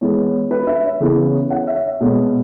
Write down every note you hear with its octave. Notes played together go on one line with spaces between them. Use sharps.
E3 G#3 B3 C#5
B4
B4 E5
C#5
C#3 E3 B3 C#5
C#5 F#5
E5
C#5
B2 G#3 B3